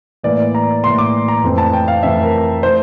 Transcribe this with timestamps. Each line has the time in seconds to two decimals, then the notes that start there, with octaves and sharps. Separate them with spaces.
0.23 A2 E3 A#3 D5
0.55 A#5
0.84 A2 E3 A#3 C6
0.98 D6
1.28 A#5
1.43 F2 E3 A3 C4
1.58 A5
1.73 G5
1.88 F5
2.03 F2 E3 A3 C4 E5
2.23 A#4
2.63 E3 A3 C5